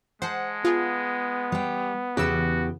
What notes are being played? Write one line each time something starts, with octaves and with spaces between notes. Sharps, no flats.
G#3 C5 F#5 A5
B3 F4 G#4
G3 G5
E2 C#3 E3 F#4 G4 E6